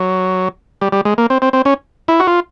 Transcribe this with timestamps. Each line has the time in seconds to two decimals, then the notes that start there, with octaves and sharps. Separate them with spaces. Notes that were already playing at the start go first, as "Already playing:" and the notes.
Already playing: F#3
0.81 G3
0.92 G3
1.05 G#3
1.18 A#3
1.30 C4
1.42 C4
1.53 C4
1.65 C#4
2.08 E4
2.20 F#4
2.27 F4